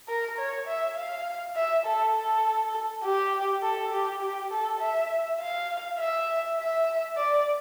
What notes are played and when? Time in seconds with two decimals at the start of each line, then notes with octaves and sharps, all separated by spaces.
0.08 A#4
0.38 C#5
0.67 E5
0.96 F5
1.56 E5
1.86 A4
2.15 A4
3.04 G4
3.63 A4
3.92 G4
4.22 G4
4.51 A4
4.81 E5
5.40 F5
5.99 E5
6.58 E5
7.17 D5